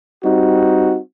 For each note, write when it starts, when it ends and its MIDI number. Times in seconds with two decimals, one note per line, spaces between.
0.24 0.99 55
0.24 0.99 60
0.24 0.99 63
0.24 0.99 66